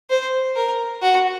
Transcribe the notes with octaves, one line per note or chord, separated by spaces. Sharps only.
C5
A#4
F#4